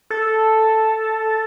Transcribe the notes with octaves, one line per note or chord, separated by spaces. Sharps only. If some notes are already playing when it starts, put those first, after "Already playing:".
A4